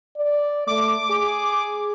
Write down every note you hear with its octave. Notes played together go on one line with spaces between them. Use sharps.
D5
A3 D6
G#4